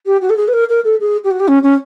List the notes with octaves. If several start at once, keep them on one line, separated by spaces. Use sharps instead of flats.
G4
F#4
A4
G#4
B4
A#4
A#4
A4
G#4
G4
F#4
G4
C#4
C#4